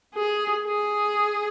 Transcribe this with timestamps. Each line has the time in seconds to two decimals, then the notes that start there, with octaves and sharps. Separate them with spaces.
0.15 G#4
0.65 G#4